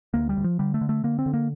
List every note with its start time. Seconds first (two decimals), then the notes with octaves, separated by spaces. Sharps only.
0.14 D2 A#3
0.29 G3
0.37 D2
0.44 F3
0.59 D3 G3
0.74 A3
0.81 D3
0.89 A3
1.03 D3 A#3
1.19 C4
1.26 D3
1.33 A#3